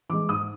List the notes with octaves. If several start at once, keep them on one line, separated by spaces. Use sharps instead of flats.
E3 G#3 D6
G#2 D#6